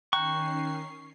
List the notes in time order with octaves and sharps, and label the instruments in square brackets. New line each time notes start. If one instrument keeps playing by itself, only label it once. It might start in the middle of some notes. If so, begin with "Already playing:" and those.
[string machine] D#3 C#4 C7 [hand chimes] G5 A#5 F#6 [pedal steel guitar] C#6